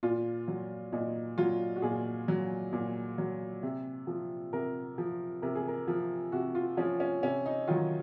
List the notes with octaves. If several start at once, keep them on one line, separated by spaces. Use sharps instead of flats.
A#2 F4
F#3
A#2 D#4
F#3 F4
F#4
A#2 G#4
F#3
A#2
F#3
C3
F3
C3 A#4
F3
C3 A#4
G#4
A#4
F3
C3 F#4
F4
F3 C#4
C#4
C3 C#4
D#4
D#3 F#3 F4